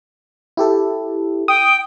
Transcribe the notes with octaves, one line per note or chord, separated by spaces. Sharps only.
E4 G4 A4
G5 D#6